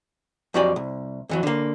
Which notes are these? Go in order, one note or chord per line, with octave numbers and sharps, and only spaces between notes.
F2 F#3 F#4 G4 D5 G#5
C2
F2 E3 F#3
D3 A#3